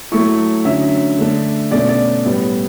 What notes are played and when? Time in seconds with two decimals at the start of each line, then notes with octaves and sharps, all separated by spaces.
0.12 F#3 A3 E4 C#6
0.65 D3 F#3 C#4 E5
1.18 D3 A3 D4
1.71 B2 A3 C#4 D5
1.89 D5
2.25 A2 G3 B3 E4